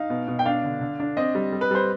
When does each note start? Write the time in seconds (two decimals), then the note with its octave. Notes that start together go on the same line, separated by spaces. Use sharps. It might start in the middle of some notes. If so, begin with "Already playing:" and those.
Already playing: D#4 F5
0.10 B2
0.28 B2
0.39 G5
0.46 D4 F5
0.64 D3
0.81 D3
1.00 D4
1.17 C4 D#5
1.35 G3
1.52 G3
1.61 B4
1.71 G3 C5